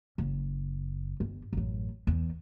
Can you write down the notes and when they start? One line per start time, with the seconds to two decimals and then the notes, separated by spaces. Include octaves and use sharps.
0.18 F#1
1.20 G1
1.53 A1 F#2
2.07 E2